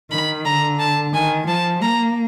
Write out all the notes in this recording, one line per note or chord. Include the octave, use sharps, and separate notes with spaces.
D#3 B5
D3 A#5
A5
D#3 G#5
F3 A5
A#3 A#5